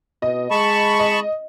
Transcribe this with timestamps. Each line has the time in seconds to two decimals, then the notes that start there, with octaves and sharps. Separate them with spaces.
0.22 B2 D#5
0.51 G#3 A5 B5 C#6
0.99 D#5